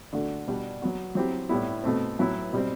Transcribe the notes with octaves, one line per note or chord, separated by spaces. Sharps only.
D3 A3 D4 F#4
B2 G3 D4 F#4
F#3 B3 F#4
F#3 C4 E4 G4
A2 G3 B3 E4
B2 A3 C4
A2 F#3 B3 E4
B2 G3 C4